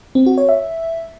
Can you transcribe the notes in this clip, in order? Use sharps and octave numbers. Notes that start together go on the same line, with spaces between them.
C4
F#4
C#5
E5